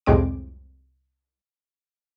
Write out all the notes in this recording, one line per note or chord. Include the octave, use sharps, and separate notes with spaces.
C2 F2 A2 G#3 C4 D6